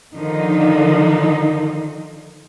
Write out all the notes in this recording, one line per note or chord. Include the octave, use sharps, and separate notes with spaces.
D3 D#3 F3 D#4